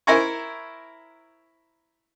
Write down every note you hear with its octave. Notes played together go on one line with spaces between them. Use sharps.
E4 A#4 C5 G#5 A#5 C#6